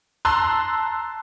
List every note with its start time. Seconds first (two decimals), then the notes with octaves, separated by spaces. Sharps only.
0.25 A5 A#5 C6 E6 F#6